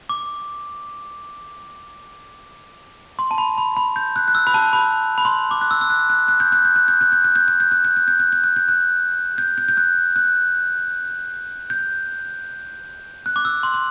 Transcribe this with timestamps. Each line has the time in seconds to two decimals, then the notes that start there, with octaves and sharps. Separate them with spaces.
0.09 D6
3.19 C6
3.31 A5
3.38 B5
3.58 B5
3.77 B5
3.96 G6
4.16 F#6
4.28 F#6
4.35 E6
4.47 B5
4.54 A5
4.73 B5
5.18 B5
5.25 C6
5.51 D6
5.61 F#6
5.71 E6
5.81 E6
5.90 F#6
6.10 F#6
6.28 F#6
6.40 G6
6.52 F#6
6.65 G6
6.76 F#6
6.88 G6
7.01 F#6
7.12 G6
7.24 F#6
7.36 G6
7.48 F#6
7.60 G6
7.71 F#6
7.85 G6
7.97 F#6
8.08 G6
8.20 F#6
8.33 G6
8.44 F#6
8.56 G6
8.68 F#6
9.38 G6
9.58 G6
9.68 G6
9.77 F#6
10.16 F#6
11.70 G6
13.26 F#6
13.36 D6
13.45 E6
13.63 C6
13.74 C6